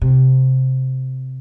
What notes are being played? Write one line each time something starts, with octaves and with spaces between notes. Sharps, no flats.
C3